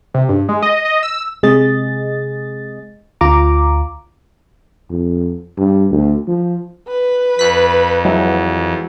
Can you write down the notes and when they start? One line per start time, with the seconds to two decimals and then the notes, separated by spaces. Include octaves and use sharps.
0.14 C3
0.29 G2
0.49 G#3
0.63 D#5
0.85 D#5
1.03 E6
1.43 C3 G#3 G#4 D#5 A6
3.21 D2 F4 A#5 D6
4.90 F2
5.58 G2
5.91 D2
6.27 F3
6.87 B4
7.39 F2 F#6 B6
8.05 E3 F#3 G#3